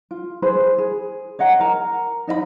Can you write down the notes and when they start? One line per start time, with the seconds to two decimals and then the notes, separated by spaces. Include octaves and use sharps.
0.11 F4
0.42 G#4 B4 C5 B5
0.78 G#4
1.39 C#5 D#5 F#5 A#5
1.59 A#4 A#5
2.27 D#4 D#5 E5 B5